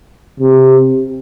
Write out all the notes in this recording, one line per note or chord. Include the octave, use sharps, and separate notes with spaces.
C3